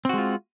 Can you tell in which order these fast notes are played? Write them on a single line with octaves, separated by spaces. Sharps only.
C4 F#4 G#3 F4